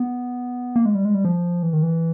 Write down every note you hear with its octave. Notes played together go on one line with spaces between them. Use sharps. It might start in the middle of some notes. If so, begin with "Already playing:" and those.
Already playing: B3
A#3
G#3
G3
G#3
G3
F3
E3
D#3
E3